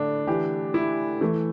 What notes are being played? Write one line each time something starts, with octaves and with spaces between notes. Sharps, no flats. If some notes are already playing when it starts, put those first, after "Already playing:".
Already playing: A2 D3 D4
E3 G4
E4
E3 A3